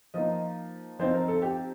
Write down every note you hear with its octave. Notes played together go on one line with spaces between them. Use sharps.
F3 A#3 D#4 D#5
F3 C4 D#4 C5
A#4
A4
G4